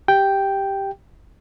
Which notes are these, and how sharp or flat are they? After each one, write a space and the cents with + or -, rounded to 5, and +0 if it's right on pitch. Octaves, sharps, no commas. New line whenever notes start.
G4 +0 G5 +0